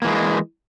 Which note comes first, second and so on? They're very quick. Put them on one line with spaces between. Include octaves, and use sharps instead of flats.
A#3 E3 G#3